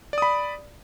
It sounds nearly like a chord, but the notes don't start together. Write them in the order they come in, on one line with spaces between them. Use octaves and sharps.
D5 D#6 B5